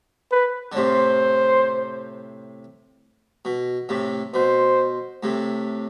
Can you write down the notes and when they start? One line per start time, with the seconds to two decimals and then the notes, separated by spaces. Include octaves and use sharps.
0.31 B4
0.72 D3
0.76 A2 C3 C5
3.45 B2
3.89 A2 C3
4.34 B2 C5
5.23 A2 C3